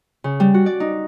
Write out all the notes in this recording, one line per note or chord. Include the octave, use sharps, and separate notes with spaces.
C#3
G3
F#4
D5
D#4